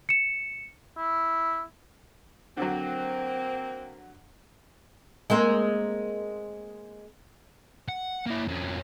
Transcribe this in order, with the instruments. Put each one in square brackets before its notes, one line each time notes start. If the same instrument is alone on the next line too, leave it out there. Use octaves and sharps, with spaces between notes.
[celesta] C#7 E7
[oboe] E4
[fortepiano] D3 F#3 [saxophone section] A#3 C4
[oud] G#3 A#3 C4
[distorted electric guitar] F#5
A#3 E4
F2 C#4